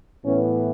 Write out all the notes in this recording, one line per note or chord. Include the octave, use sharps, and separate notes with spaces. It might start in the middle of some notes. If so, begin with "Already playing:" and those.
A2 E3 B3 C#4